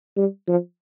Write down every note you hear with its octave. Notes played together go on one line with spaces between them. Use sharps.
G3
F3